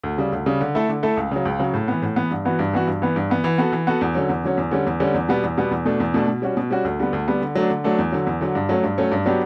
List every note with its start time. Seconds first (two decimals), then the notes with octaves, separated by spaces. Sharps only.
0.03 D2
0.18 C#3 G3
0.32 D2
0.46 C#3 G3
0.61 D3
0.75 A3 E4 A4
0.89 D3
1.03 A3 E4 A4
1.17 C#2
1.31 C#3 F#3
1.45 C#2
1.59 C#3 F#3
1.74 A2
1.88 E3 B3
2.02 A2
2.16 E3 B3
2.31 G2
2.45 E3 B3 F#4
2.59 G2
2.73 E3 B3 F#4
2.87 G2
3.02 E3 B3
3.16 G2
3.30 E3 B3
3.44 E3
3.58 B3 F#4 A4
3.73 E3
3.87 B3 F#4 A4
4.01 E2
4.15 D3 F#3 C#4
4.29 E2
4.44 D3 F#3 C#4
4.57 E2
4.71 D3 G3 C#4
4.87 E2
5.00 D3 G3 C#4
5.14 E2
5.29 B2 G3 B3
5.43 E2
5.58 B2 G3 B3
5.71 E2
5.85 B2 A3 D4
6.00 E2
6.14 B2 A3 D4
6.28 B2
6.42 G3 C#4 F#4
6.57 B2
6.71 G3 C#4 F#4
6.85 D2
7.00 D3 G3 B3
7.13 D2
7.28 D3 G3 B3
7.42 D3
7.55 F#3 A3 D4
7.70 D3
7.84 F#3 A3 D4
7.98 E2
8.12 D3 F#3
8.27 E2
8.41 D3 F#3
8.55 G2
8.69 F#3 A3 C#4
8.83 G2
8.98 F#3 A3 C#4
9.12 G2
9.26 F#3 B3 D4 G4